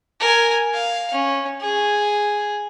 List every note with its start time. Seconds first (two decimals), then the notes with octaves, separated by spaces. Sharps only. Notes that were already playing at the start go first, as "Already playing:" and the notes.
0.20 A#4 G#5
0.74 F5
1.12 C#4
1.61 G#4